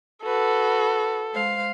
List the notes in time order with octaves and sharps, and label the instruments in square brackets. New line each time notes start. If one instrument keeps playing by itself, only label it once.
[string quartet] F#4 B4 [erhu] A4
[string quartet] G#3 C5 F5